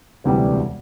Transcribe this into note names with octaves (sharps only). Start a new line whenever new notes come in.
E1 D2 C3 E3 G3